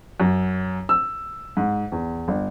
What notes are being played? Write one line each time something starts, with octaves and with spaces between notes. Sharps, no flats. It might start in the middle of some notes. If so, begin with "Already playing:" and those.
F#2
E6
G#2
E2
G1